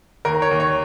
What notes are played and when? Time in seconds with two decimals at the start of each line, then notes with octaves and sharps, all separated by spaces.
0.25 D#2 A#4
0.42 C#5
0.51 D#2
0.60 C#5